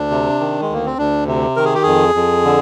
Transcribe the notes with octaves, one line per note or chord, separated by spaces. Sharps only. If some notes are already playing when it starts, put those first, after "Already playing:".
Already playing: D2 D4
C3
D#3
G#3
D2 A#3
C4
D2 D4
C3
D#3 A#4
G#4
G4
F2 G#4
F2
D3